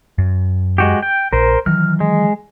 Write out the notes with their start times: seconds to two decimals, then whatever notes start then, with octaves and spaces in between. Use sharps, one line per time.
0.18 F#2
0.78 G#3 F#4 G4
1.02 G5
1.33 A#1 A#4 C5
1.66 D#3 E3 F#3 F6
2.00 G#3